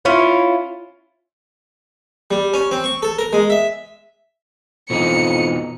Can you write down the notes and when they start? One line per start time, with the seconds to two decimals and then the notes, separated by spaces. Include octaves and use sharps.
0.05 C#4 E4 F4 C#5
2.31 G3
2.54 C#4
2.71 C4
2.84 C#6
3.02 A4
3.18 A#4
3.33 G#3
3.50 E5
4.90 F2 B2 E3 D#4 C#7